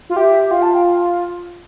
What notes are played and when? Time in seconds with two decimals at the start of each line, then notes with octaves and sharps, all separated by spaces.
0.10 F4
0.16 G4 E5
0.51 F4 F5
0.62 A5
0.74 G5